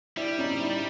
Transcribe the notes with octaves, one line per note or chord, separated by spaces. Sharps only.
G3 D4 E4
C#4 D#4
D4 E4